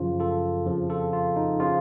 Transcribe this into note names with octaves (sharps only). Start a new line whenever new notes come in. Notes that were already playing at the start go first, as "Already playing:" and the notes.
Already playing: F#2 C#3 F3 F4
F4 A4
F2 C#3 F3
F4 A4
F4
D#4
C#3 F3 F4